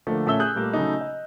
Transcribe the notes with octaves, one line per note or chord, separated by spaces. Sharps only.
D3 F3 A3 A#3
A#2 A3 C#4 E5 E6 G7
G#4 D#6 F#6 G6
A#2 G3 A3 A#3
C#3 F#3 A3 D#4
D#5